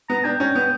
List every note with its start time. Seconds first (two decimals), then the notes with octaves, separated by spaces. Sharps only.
0.09 B3 A#5
0.24 D4 G5
0.40 C#4 G5
0.55 B3